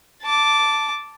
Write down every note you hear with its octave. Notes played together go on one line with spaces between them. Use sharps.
A5 D6